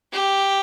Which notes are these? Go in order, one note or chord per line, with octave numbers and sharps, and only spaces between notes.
G4